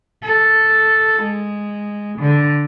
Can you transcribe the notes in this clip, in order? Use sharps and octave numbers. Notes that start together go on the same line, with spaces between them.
A4
G#3
D3